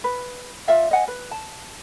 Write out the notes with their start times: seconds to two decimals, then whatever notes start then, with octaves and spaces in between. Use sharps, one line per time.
0.04 B4
0.68 F4 D5 E5 F5
0.91 D#5 F#5 G#5
1.08 B4
1.31 A5